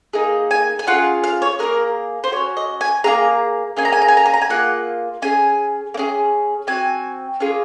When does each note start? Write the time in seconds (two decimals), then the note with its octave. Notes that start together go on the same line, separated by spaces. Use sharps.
0.13 A#3 D#4 G#4
0.51 G#5
0.79 G#5
0.87 C#4 F4 G#4 F#5
1.24 F5
1.42 C#5
1.59 A#3 C#4 G#4 A#4
2.24 C5
2.31 F#4 C#5
2.36 C#4
2.57 D#5
2.81 G#5
3.04 A#3 F4 G#4 A#5
3.77 A#3 C#4 G#4 G#5
3.85 A#5
3.92 G#5
4.02 A#5
4.08 G#5
4.17 A#5
4.26 G#5
4.34 A#5
4.41 G#5
4.50 A#3 F4 G#4 F#5
5.22 C#4 G#4 G#5
5.94 A#3
5.97 C#4 G#4
6.67 C4 F#4 G#5
7.40 A#3 C#4 F4 G#4